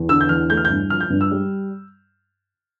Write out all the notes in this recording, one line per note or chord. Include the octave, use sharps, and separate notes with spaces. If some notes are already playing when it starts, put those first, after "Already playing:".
Already playing: E2
D3 E6
G6
E2 F6
A3 G6
F6
G6
G2
F3 F6
G6
G2
E6
G3